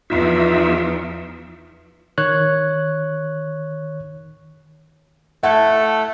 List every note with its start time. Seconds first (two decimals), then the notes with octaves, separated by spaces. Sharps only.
0.10 E2 F3 D#4 F4 E5
2.18 D#3 C#5 F#6
5.43 A3 E4 A4 F#5